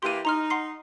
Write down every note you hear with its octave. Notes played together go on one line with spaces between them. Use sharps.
E3 A#3 G4 C6 D#7
D#4 A#5 C6 F6
F#5 C6 C7